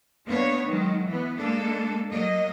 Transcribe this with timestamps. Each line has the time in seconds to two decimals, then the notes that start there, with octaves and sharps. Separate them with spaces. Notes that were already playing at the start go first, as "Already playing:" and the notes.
0.27 A#3 B3 D4 C#5
0.67 D#3 F#3 G#3
1.06 E3 B3
1.37 G#3 A#3 D4 A4
2.11 F#3 A#3 D#5